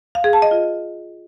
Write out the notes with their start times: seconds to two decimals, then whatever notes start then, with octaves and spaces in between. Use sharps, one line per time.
0.15 F5
0.24 G#4
0.33 A5
0.42 D#5
0.51 F4